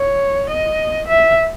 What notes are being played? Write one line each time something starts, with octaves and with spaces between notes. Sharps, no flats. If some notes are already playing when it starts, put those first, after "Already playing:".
Already playing: C#5
D#5
E5